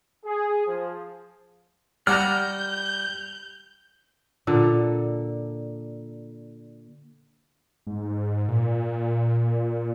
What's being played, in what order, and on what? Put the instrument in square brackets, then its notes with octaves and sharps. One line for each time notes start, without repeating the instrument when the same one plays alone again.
[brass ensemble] G#4
F3
[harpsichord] G3 [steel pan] D5 F#5 A#5 [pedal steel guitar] F6 [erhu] G6
[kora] A#2 D3 A4
[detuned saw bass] G#2
A#2